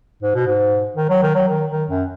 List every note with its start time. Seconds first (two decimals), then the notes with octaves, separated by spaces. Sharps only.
0.23 G#2
0.35 B2
0.46 G#2
0.97 D#3
1.09 F#3
1.23 D#3
1.35 F#3
1.48 D#3
1.71 D#3
1.90 F#2